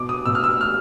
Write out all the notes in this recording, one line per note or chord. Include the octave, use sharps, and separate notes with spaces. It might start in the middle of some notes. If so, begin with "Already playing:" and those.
Already playing: B2 D6
D#6
B2 E6
F6
E6
F6